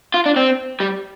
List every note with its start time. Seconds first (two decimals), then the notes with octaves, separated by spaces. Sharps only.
0.14 F4
0.26 D4
0.36 C4
0.80 G3